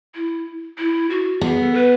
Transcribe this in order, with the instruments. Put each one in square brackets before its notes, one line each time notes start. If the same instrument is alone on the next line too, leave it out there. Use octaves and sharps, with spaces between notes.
[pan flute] E4
E4
F#4
[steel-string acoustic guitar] B3 [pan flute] G#4
[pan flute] A4
B4